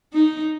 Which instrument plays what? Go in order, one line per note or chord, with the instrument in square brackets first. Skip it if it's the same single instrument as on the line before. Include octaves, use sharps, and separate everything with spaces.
[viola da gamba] D#4